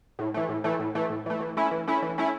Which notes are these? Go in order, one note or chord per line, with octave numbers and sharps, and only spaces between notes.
A2
E3 A3
A2
E3 A3
A2
E3 A3
A2
E3 A3
E3
A3 C#4 E4
E3
A3 C#4 E4
E3
A3 C#4 E4